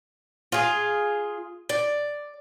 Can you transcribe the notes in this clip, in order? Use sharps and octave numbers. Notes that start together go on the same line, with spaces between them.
F4 G#4
D5